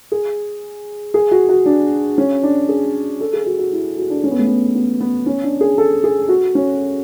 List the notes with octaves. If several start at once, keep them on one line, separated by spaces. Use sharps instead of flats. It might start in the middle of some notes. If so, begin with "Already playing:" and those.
G#4
G#4
F#4
F#4
D4
C#4
D4
G#4
A4
G#4
F#4
F#4
E4
F#4
D4
C#4
B3
A3
B3
B3
B3
C#4
D4
G#4
A4
G#4
F#4
C#4